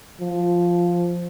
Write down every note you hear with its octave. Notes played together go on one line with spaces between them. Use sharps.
F3